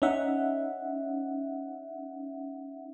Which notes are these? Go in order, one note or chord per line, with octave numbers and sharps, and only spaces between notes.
C#4 D#4 E5 F#5